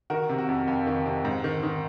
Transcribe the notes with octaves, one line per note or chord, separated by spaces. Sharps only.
D#3 F#4 A#4
C3
F#4
F2
F2 F4
D#3
C3
G#2
D#3
D#3